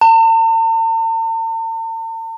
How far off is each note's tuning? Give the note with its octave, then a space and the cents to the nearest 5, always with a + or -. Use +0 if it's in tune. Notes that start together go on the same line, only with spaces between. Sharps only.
A5 +45